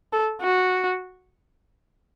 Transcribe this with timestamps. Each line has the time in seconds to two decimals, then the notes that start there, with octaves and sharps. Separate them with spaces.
0.13 A4
0.42 F#4